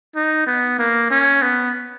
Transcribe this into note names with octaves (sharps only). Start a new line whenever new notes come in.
D#4
B3
A#3
C#4
B3